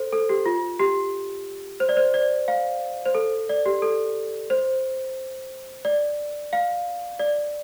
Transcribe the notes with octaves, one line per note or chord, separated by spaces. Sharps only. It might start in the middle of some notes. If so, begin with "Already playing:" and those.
Already playing: A4 C5
A4
G4
F4
G4
C5
D5
C5
D5
F5
C5
A4
D5
G4
A4
C5
D5
F5
D5